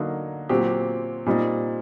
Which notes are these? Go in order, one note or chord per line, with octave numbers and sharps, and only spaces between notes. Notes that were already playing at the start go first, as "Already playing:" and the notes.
Already playing: D3 F#3 A#3 D#4
A#2 F#3 C4 G4
A#2 G3 C4 D#4